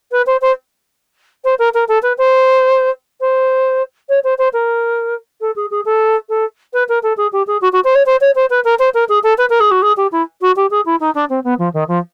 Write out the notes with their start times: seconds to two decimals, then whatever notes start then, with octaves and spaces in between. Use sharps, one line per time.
0.11 B4
0.26 C5
0.41 C5
1.44 C5
1.58 A#4
1.74 A#4
1.88 A4
2.02 B4
2.18 C5
3.20 C5
4.09 C#5
4.24 C5
4.38 C5
4.53 A#4
5.41 A4
5.56 G#4
5.71 G#4
5.85 A4
6.29 A4
6.73 B4
6.88 A#4
7.03 A4
7.17 G#4
7.32 G4
7.47 G#4
7.61 F#4
7.72 F#4
7.84 C5
7.95 C#5
8.06 C5
8.20 C#5
8.35 C5
8.50 B4
8.64 A#4
8.79 C5
8.94 A#4
9.08 G#4
9.23 A4
9.38 B4
9.49 A#4
9.60 G#4
9.71 F#4
9.82 G#4
9.96 G4
10.12 E4
10.41 F#4
10.56 G4
10.70 G#4
10.85 E4
11.00 D#4
11.14 D4
11.29 C4
11.44 B3
11.58 F3
11.73 D#3
11.88 F3